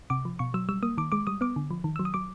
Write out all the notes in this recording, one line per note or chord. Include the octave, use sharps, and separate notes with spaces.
C3 D6
F3
B2 C#6
F#3 E6
G3 E6
A#3 D#6
D#3 D6
G#3 D6
G3 D#6
B3 D6
D3
F3
D#3
F#3 E6
D#6
F#3 D6